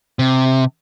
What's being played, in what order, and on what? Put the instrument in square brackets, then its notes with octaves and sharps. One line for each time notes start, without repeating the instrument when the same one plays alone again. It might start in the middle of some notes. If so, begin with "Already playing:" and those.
[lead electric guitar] C3